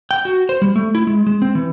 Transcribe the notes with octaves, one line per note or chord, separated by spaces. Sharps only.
G5
F#4
C5
G3
A3
E4
G#3
G#3
C4
E3